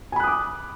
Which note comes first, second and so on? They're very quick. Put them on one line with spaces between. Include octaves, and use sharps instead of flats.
G#5 B5 F#6 D#6 D6